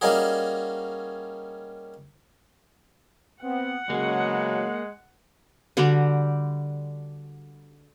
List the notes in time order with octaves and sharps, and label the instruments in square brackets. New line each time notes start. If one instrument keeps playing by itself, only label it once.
[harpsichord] G3 A#3 C#4 D#4 F#4 G#4
[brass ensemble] B3 C4 [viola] F#5
[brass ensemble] B1 C#3 F#3 [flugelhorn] G#3 [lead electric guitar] A#3 G#4
[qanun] D3 G3 F#4 G4